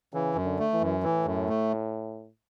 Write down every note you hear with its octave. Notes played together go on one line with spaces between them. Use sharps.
C#3 E3
F#2
D3
A3
E3
F#2
A2 E3
F#2
A3